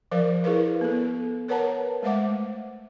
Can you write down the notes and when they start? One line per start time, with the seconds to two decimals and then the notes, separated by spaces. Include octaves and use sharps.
0.11 F3 A#4 C5 F5
0.44 E4 G#4 A#4 B4 F5
0.81 B3 A4
1.48 A#4 B4 C#5 F#5 A5 A#5
2.03 G#3 A3 C5 E5 F#5 D6